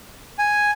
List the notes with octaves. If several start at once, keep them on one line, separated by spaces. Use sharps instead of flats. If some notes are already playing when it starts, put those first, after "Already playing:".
G#5